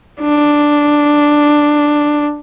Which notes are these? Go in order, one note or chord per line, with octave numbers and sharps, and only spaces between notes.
D4